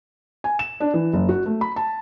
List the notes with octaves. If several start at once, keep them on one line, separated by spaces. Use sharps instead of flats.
G#5
E7
D4
E3
F#1
F#4
A3
B5
A5